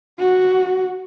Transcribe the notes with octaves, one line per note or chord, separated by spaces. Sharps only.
F#4